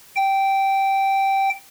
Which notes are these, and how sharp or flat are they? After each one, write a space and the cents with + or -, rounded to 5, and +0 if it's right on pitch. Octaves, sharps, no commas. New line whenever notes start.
G5 -10